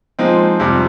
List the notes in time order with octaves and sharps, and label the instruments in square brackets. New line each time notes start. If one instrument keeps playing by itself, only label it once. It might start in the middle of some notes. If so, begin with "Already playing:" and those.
[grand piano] A#2 F3 G#3 C4 D#4
F2 C3 G3